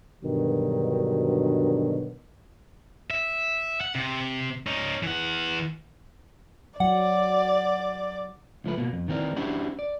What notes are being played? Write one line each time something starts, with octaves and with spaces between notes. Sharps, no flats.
G2 B2 D3 D#3 F#3
E5
F#5
C3
C#4 D#4
E3 F#5
F#3 D5 F#5
C#2 F3 A3 B4
B2 A#3
F2
D#3 E3 C4 A#4 D5
C#4 D4 E4 F#4 G4 C5
D5